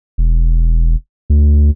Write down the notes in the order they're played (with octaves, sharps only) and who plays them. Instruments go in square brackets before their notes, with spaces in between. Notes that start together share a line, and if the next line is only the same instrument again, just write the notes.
[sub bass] E1
D2